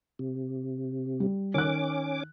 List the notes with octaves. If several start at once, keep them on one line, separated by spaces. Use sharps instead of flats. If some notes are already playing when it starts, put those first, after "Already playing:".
C3
G3
D#3 C#4 D6 F#6